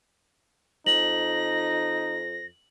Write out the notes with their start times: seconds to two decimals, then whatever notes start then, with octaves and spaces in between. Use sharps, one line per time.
0.86 F2 D#4 A#6 F#7